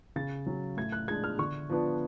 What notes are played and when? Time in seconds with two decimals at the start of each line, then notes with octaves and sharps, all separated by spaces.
0.16 C#3 A6
0.46 F#3 C#4
0.77 A2 G#6
0.92 F#6
1.08 G#3 D4 G#6
1.24 F6
1.38 D3 C#6
1.69 F3 B3 D4